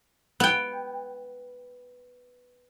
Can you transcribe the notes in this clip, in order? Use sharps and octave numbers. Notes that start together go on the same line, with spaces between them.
B3 G5